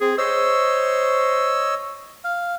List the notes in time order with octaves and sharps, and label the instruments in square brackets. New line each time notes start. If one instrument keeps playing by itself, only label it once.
[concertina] C4 [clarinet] G#4
[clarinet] C5 [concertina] C#5 D#5 E6
[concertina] F5